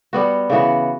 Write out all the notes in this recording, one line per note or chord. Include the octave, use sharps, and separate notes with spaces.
G3 B3 F#4
C#3 E3 B3 F#4